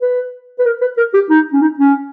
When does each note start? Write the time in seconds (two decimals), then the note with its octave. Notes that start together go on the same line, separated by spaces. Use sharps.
0.02 B4
0.59 B4
0.66 A#4
0.81 B4
0.97 A#4
1.14 G4
1.30 D#4
1.53 C#4
1.62 D#4
1.78 C#4